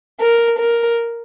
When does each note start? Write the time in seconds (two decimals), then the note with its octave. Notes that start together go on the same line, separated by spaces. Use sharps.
0.20 A#4
0.59 A#4